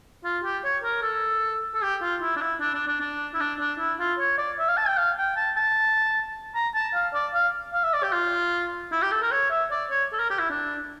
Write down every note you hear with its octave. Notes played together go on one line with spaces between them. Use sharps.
F4
G4
C#5
A#4
A4
A4
G4
F4
E4
D4
E4
D4
D4
D4
D4
E4
D4
D4
E4
F4
C#5
D5
E5
F5
A5
G5
F5
G5
A5
A5
A#5
A5
F5
D5
F5
F5
E5
D5
G4
F4
E4
G4
A4
A#4
C#5
E5
D5
C#5
A4
A#4
G4
E4
D4